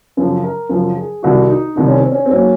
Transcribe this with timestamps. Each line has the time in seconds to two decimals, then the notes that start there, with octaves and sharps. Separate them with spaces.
0.17 F#2 C#3 F3
0.44 A#4
0.69 F#2 C#3 F3 A#4
0.97 G#4
1.23 C2 C3 D#3 F#4
1.50 D#4
1.76 C2 C3 D#3 D#4
1.88 C#4
1.99 C4
2.12 C#4
2.25 C4
2.29 G#2 F#3 A#3 C#4